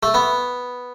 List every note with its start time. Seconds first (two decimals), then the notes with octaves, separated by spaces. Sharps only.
0.03 A3
0.14 B3